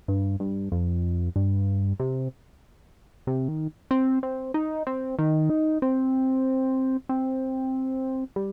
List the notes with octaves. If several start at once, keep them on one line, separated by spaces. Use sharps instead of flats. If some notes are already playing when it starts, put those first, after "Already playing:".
G2
G2
F2
G2
C3
C3
D#3
C4
C4
D#4
C4
D#3
D#4
C4
C4
G3